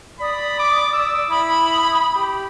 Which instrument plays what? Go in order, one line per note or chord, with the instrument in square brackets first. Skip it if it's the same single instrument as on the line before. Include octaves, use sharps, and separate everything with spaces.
[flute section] D5 D#6 [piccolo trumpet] B5
[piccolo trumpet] D6
E6
[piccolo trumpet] E4 [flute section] B5 D#6
[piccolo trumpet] G4